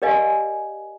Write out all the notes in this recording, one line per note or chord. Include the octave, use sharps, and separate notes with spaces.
G4 A#4 D5 D#5 F5 G#5